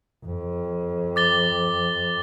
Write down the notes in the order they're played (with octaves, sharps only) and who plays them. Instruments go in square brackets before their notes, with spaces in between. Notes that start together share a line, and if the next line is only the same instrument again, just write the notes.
[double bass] F2
[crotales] D6 A6 G7